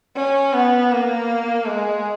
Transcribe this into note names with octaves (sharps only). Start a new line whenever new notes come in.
C#4
B3
A#3
G#3